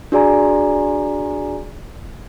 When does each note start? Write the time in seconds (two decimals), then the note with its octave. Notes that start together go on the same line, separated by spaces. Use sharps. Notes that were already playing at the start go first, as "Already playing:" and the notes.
0.12 D4 F#4 G#4 D5 G#5 A#5